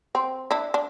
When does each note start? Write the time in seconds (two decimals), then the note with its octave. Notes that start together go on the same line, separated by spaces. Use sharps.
0.15 C4
0.51 D4 E4
0.74 D4